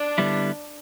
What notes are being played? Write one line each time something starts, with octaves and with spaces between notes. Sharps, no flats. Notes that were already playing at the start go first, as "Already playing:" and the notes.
Already playing: D4
D3 G3 B3 E4